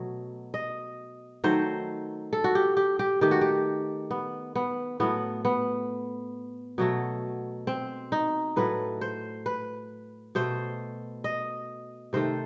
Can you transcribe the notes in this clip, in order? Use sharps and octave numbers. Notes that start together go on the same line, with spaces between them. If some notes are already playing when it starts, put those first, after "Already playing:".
Already playing: B2 F#3 A3
D#5
D#3 F#3 A3 C5
A4
F#4
G4
G4
G4
D#3 A3 G4
F#4
G4
B3
B3
A2 F#3 A3 B3
B3
B2 F#3 A3
C4
D#4
A2 F#3 A3 B4
C5
B4
B2 A3 C5
D#5
C3 D#3 A3 C5